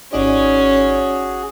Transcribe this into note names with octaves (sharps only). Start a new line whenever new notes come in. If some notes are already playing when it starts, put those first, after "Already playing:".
G#1 C#4 D#4 F#4 G#4 D5